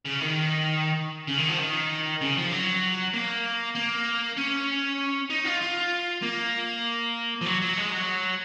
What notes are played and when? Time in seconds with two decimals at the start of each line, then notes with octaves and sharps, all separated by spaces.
0.05 C#3
0.20 D#3
1.28 C#3
1.38 D#3
1.49 F3
1.60 D#3
2.21 C#3
2.37 F3
2.51 F#3
3.14 A#3
3.76 A#3
4.37 C#4
5.30 D#4
5.45 F4
5.61 F4
6.22 A#3
7.41 F3
7.46 F#3
7.61 F#3
7.77 G#3
7.92 F#3